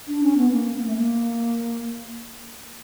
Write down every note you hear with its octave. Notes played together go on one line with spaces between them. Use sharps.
D4
C#4
B3
A#3
A#3
A3
A#3